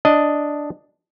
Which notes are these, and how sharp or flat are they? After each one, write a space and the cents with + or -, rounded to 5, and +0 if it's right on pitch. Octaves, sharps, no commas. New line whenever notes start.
D4 +0 D#5 +0